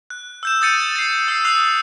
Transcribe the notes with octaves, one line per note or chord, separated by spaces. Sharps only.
F#6
E6 G6 E7
D#6 G6 A6 C#7 D#7
A6 C7
E6 C7
D#6 E6 F#6 C7 F7